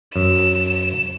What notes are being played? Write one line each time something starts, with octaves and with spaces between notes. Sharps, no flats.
F#2 E7